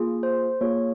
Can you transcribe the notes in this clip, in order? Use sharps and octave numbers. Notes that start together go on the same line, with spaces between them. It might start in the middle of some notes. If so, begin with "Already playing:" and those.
Already playing: A#3 F4 G#4
C5
A#3 F4 G#4 C#5